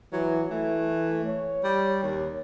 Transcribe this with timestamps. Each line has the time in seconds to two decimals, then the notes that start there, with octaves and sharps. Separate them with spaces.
0.13 E3 F#3
0.51 E3 A3
1.25 C#5
1.64 G3
2.03 D#2